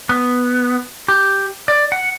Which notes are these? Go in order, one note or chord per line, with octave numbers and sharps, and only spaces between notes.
B3
G4
D5
F#5